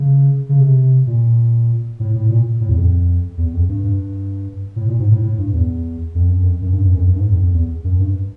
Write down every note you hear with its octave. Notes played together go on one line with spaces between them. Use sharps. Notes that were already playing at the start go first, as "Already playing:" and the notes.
Already playing: C#3
C#3
C3
A#2
A2
A2
A#2
A2
E2
F2
E2
F2
G2
G2
A2
A#2
G#2
A2
A2
G2
E2
F2
F#2
F2
F#2
G2
F#2
F2
F#2
G2
G#2
F2
F2
E2
F#2
G2